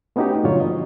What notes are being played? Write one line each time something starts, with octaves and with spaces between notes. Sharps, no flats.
A3 B3 C#4 D#4 F#4 G4
G2 A#2 D3 F#3 F4 C#5
F3 D#5